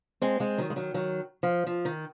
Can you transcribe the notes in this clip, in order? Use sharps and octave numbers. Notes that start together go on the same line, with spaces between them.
G#3 C4
G#3 C4
D#3 F#3
G#3
D#3 F#3
D#3 F#3
F3
F3
D#3